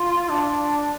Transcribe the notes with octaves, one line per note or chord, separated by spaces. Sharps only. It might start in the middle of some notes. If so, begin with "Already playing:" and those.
Already playing: F4
D4